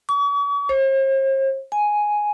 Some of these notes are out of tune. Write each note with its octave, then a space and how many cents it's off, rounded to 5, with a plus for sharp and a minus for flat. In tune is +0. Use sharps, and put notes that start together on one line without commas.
C#6 +45
C5 +45
G#5 +5